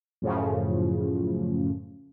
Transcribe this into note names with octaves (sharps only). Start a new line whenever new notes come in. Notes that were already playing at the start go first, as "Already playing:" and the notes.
F#2 A2 C#3 F3